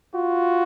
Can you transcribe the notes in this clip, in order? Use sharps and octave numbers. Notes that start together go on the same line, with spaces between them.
F4 F#4